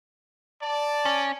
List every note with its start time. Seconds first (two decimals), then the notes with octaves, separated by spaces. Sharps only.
0.62 D5 A5
1.05 C#4